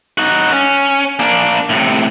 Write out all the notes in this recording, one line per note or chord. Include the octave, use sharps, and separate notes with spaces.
D#4 F#4
C#4
A#3 D4
A2 C3